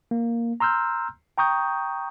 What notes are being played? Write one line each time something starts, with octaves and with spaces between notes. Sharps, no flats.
A#3
A#5 C6 E6 F6 G6
G5 A#5 C#6 D#6 G6